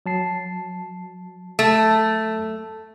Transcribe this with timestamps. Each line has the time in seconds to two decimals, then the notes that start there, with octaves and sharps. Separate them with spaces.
0.06 F#3 A5 C7
1.59 A3